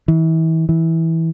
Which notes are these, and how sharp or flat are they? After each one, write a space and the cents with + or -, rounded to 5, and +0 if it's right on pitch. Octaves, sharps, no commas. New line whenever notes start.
E3 -35
E3 -15